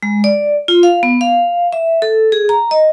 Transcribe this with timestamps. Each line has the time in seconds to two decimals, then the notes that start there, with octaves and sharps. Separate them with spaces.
0.03 G#3
0.24 D5
0.68 F4
0.83 F5
1.03 B3
1.21 F5
1.73 E5
2.02 A4
2.32 G#4
2.49 A#5
2.71 D#5